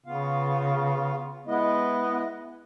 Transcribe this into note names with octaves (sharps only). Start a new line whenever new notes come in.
C#3 B3 F4 F5
G#3 B3 E4 D#5